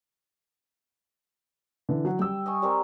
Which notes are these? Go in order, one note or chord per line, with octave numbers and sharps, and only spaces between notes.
D3 E3
F#3 F#5
G3 G5 E6
D#5 G#5 C#6
G3 C4 A#4